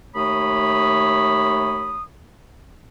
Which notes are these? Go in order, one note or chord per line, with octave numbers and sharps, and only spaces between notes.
D#2 A3 C#5 B5 D#6